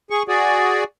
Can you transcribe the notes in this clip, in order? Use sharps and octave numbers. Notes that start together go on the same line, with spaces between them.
G#4 C#6
F#4 G#4 D5